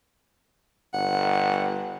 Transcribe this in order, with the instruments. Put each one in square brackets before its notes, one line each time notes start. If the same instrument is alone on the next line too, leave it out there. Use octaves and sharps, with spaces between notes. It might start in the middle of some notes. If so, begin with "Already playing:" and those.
[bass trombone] G1 [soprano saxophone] F#5